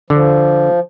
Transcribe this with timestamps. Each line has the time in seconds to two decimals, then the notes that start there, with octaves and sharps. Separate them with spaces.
0.10 D3 F3